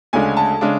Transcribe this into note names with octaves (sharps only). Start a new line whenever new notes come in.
D2 C#3 G#3 D4 G#5
A5
C#3 G#3 D4